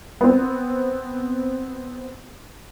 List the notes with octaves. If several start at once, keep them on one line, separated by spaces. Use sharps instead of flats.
B3 C4